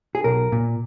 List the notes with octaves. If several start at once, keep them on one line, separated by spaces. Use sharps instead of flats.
G#4
B1 A#4
A#2